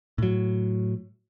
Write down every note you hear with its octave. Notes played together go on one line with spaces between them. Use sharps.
A2 F#3